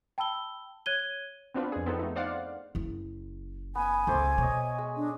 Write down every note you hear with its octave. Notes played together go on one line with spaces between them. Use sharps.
G5 A5 B5 E6 G7
C#5 F#6 G#6 D#7 G7
B3 C4 D4 F4 B4
F2 G#4
B3 C4 D#4 A4
A3 D#4
C5 D5 F5 F#5
F#1 E4
B3 G#5
C#2 A3 C5 D6
B2 C#5 D#5
G#3
D4